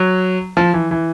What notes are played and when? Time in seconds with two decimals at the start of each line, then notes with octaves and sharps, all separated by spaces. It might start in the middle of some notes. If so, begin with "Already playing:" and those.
Already playing: F#3
0.57 F3
0.74 E3
0.91 E3